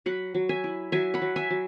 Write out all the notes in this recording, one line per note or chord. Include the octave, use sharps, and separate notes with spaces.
F#3 F#5 B5
F#3
E5 G#5
E4
F#3 E5 G#5
F#5 B5
F#3
E5 G#5
F#3